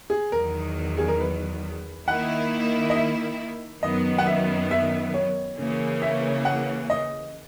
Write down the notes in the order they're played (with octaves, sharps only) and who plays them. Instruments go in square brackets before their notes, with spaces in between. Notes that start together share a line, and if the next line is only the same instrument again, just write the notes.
[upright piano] G#4
[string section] E2 D#3 F#3 [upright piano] A#4
[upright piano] G#4
A#4
B4
[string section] D#3 A#3 E4 [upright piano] F#5
[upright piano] D#5
E5
[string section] F#2 D#3 F#3 B3 [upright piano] D#5
[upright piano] F#5
E5
E5
C#5
[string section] C#3 E3 A#3 C#4
[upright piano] E5
F#5
D#5